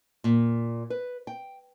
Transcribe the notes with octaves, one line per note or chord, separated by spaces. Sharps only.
A#2
B4
G5